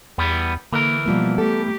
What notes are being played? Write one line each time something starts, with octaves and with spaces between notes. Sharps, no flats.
E2 E3 G3 B3
D3 E3 A#3 A#4
B2 F3 G3 A#3
A3 B3 G4 A4